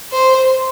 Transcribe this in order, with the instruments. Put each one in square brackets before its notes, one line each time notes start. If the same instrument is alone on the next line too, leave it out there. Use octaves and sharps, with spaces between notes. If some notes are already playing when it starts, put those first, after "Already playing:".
[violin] C5